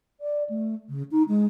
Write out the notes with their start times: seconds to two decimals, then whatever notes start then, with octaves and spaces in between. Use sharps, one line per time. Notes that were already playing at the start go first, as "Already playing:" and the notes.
0.20 D5
0.49 A3
0.89 C#3
1.11 D#4
1.28 G#3